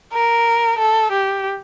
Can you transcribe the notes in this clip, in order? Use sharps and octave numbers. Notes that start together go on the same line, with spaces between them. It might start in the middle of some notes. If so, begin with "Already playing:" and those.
A#4
A4
G4